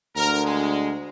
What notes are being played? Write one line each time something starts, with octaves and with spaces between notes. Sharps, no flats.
D2 A#4
G#3